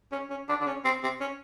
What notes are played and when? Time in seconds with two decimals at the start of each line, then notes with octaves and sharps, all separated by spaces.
0.12 C#4
0.30 C#4
0.49 D4
0.61 D4
0.67 C#4
0.85 C4
1.03 C4
1.21 C#4